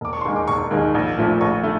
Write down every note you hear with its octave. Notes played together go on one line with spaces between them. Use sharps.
E1 D6
C#6
C6
D#2 D#3 G#3 C#6
D6
E1 C#6
D#2 D#3 G#3
A#1
A#2 F3 A3
A#1 C#6
A3